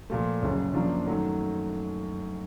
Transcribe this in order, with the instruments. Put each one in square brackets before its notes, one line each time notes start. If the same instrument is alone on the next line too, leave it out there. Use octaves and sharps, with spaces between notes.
[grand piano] A#2 F3 A3
F#1 F#2 C#3 F#3
F#2 C#3 F3 A#3 D4
F#2 D#3 F#3 A3